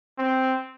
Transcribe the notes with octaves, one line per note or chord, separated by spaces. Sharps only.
C4